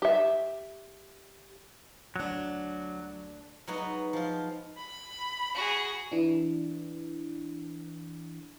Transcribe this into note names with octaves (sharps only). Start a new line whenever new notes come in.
G4 E5
D2 F#3 D4
F#3 G#3 B3 D#4 F#4
F3 F4
B5
F#4 G#4
E3 D4